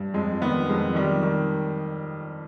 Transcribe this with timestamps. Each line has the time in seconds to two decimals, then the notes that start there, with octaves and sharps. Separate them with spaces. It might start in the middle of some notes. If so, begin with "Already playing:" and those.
Already playing: G2
0.14 F2 G#3
0.42 D#3 B3
0.69 F2 G#3
0.95 D#3 G3
1.23 D#3